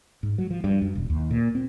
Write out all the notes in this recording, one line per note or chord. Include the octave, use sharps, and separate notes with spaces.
G#2
F#3
F3
G2
F#2
E1
D#2
A#2
C4